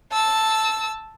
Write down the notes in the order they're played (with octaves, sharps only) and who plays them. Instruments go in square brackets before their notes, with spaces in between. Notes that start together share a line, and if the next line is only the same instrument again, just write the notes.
[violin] A5 E6